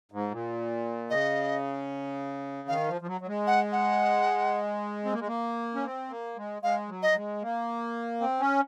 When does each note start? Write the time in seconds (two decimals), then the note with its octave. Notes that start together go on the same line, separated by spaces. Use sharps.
0.12 G#2
0.31 A#2
1.10 C#3 D#5
2.68 D#3 F5
2.88 F3
3.01 F3
3.07 F#3
3.21 F#3
3.28 G#3
3.47 F#5
3.72 F#5
5.05 C4
5.12 A#3
5.20 G#3
5.27 A#3
5.75 C#4
5.84 C4
6.10 A#3
6.37 G#3
6.62 G#3 F5
6.89 F#3
7.03 D#5
7.15 G#3
7.42 A#3
8.21 C4
8.40 C#4